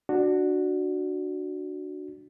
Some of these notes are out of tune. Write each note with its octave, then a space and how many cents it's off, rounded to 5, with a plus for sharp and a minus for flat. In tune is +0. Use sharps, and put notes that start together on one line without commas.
D4 +15 F#4 +0